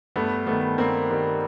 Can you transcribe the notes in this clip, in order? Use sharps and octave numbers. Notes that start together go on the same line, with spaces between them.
G2 A3 B3
D#3 G3 A3 B3
G2 A#3 C4
D#3 G3